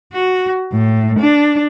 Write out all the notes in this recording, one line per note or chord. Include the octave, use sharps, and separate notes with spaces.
F#4
A2
D4